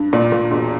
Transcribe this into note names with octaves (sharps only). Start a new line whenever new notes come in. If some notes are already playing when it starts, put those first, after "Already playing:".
Already playing: G2
A#2 D5
A#2
E1